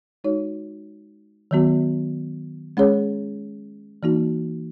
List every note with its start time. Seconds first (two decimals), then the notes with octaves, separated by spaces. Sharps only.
0.24 G#3 D#4 F#4 C#5
1.51 D#3 F#3 B3 F#4
2.77 G#3 C#4 G#4 C#5
4.03 E3 A#3 D#4 F#4